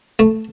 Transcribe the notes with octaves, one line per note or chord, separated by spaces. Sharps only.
A3